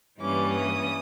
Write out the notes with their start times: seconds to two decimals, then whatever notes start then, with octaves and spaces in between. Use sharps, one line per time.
0.20 G2 E3 G3 A#3 C#4 D6
0.53 D#6